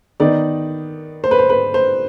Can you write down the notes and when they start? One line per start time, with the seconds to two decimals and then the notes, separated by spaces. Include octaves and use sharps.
0.20 D#3 B3 D#4 D5
1.24 C5
1.31 B4
1.39 C5
1.50 B4
1.74 C5